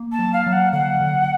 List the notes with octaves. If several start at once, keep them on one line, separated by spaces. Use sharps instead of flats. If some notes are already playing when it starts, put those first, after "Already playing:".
Already playing: A#3
A5
F#3
F5
F#3
F#5
D3 F#5
D3